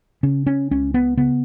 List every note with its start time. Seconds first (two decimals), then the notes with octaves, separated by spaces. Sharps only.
0.23 C#3 C#4
0.47 C#4
0.71 C#2 C#4
0.94 B3
1.17 C#3 B3